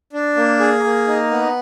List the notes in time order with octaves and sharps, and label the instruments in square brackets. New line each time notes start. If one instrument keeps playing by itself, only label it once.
[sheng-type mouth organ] D4
A#3
G#4
A#3
D#4
B3